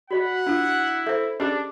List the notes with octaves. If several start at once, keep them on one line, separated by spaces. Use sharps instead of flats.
F#4 D5 D#5 F#5 B5
D4 E4 F4 B5
A4 C5 E5
C#4 D4 G4 G#4 D#5 D6